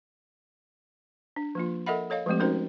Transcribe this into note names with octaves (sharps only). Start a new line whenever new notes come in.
D4
F3 A#3 F4
A4 A#4 D#5 E5 F#5 B5
A4 C#5 D#5 F5
F3 G#3 A3 C4 G4
C#4 D#4 F#4 A#4 C5